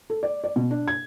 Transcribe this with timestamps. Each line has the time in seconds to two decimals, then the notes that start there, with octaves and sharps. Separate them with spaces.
0.10 A4
0.23 D5
0.44 D5
0.56 B2
0.71 D4
0.88 G#6